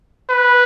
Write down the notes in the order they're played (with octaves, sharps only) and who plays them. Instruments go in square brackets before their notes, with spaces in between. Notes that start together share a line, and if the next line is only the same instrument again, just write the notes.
[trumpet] B4